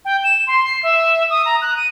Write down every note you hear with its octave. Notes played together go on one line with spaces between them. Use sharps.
G5
E7
C6
C7
E5
D#6
A#5
F#6
D#7